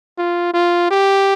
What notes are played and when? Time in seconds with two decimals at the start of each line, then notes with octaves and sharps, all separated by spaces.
0.18 F4
0.54 F4
0.91 G4